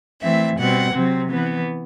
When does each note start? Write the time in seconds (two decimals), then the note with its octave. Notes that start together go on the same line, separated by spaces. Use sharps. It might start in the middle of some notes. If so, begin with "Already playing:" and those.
0.22 E3 A3 C4 E5
0.57 B2 G3 C4 F#5
0.93 C3 F#3 C4
1.29 E3 B3